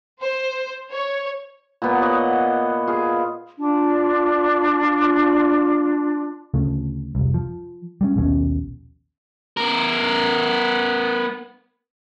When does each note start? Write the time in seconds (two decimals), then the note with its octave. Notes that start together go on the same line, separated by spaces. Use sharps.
0.20 C5
0.90 C#5
1.82 A#2 B3
2.01 C#5 D#5 F#5
2.87 F4 G#4
3.58 D4 F4
6.54 D2 C#3 F3 A3
7.15 F1 C2
7.34 F3
8.01 G3 G#3 C#4
8.16 A#1 D#2 B2 C#4
9.57 B3 A#4